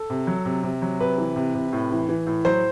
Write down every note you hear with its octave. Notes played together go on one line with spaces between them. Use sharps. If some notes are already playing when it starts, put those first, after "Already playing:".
Already playing: A4
C3
F#3
C3
C3
F#3
C3 B4
E3
C3
C3
A2
E3
E3
A2
F#3 C5